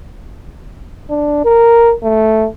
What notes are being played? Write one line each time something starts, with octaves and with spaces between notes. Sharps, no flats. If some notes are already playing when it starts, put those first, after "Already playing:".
D4
A#4
A3